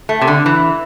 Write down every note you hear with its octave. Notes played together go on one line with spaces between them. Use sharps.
A3
C3
D3
E3